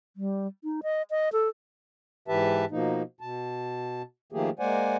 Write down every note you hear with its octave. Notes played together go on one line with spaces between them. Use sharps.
G3
D#4
D#5
D#5
A4
G#2 E3 G4 B4 E5 A5
B2 F3 A#3 D#4
B2 A5
D#3 F3 A3 A#3 G4 G#4
G#3 A#3 C5 D5 F#5 G#5